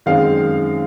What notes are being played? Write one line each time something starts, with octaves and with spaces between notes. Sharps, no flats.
F#2 D#3 G#3 C4 F5